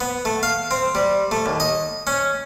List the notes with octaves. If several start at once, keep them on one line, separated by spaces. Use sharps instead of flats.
B3
A3
F5
C4
G3
A3
D#2
D#5
C#4